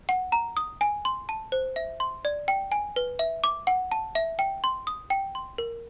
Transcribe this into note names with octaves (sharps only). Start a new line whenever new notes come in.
F#5
A#5
D#6
G#5
C6
A5
C5
E5
C6
D5
G5
G#5
B4
E5
D6
F#5
A5
E5
G5
C6
D#6
G5
C6
A#4